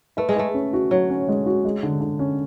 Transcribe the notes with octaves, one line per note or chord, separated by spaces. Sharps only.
A3 B4
G#3
A3 B4
C#4
F#4
F#3 F#4
C#4
G#3
F#4
G#3
D3
D3
C#4